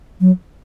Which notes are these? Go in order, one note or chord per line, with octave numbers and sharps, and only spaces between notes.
F#3